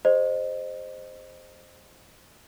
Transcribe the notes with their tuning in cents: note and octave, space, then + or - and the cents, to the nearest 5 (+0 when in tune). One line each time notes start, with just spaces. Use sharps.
G#4 -20 C5 +0 D#5 -20